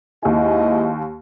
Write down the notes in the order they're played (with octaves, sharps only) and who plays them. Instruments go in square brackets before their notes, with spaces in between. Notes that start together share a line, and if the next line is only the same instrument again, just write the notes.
[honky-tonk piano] D#2 G#5 [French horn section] G#2 E4 D#5